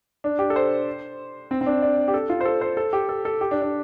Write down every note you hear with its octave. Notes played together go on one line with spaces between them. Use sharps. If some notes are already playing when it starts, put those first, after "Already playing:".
D4
G4
A4
C5
C4
C4
D4
D5
G4
A4
F4
C5
A4
C5
A4
G4
A4
A4
G4
D4
D4